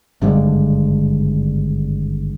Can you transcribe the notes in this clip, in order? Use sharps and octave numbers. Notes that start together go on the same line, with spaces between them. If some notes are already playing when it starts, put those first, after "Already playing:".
G#1 G2 D3 G#3